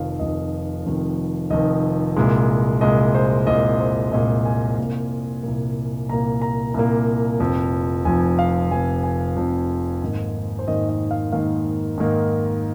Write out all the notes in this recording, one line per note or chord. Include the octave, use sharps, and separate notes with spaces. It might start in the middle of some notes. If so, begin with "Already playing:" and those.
Already playing: F1 F2 D#3 F5
F1 F2 D#3 D#5
F1 F2 D#3
F1 F2 D#3 D#5
C2 A#2 G#3
C2 A#2 G#3 D#5
C5
C2 A#2 G#3 D#5
C5
C2 A#2 G#3 D#5
G#5
C2 A#2 A#3
C2 A#2 A#3
C2 A#2 A#3 A#5
A#5
C2 A#2 A#3
F1 F2 F3
F1 F2 F3 G#5
F5
F1 F2 F3 G#5
G#5
F1 F2 F3
G#2 D#3 A#3
C5
G#2 D#3 A#3 D#5
D#5
F5
G#2 D#3 A#3 F5
G#2 D#3 A#3